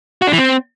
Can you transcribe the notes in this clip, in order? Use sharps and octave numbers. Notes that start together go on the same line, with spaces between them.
F#4
D4
E3
C4